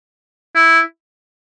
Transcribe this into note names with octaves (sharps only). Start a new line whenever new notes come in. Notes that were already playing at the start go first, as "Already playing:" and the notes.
E4